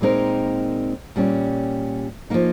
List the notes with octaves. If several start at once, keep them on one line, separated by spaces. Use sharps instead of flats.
A#2 G#3 C4 D#4 A#4
A#2 G3 C#4
F3 A#3 D#4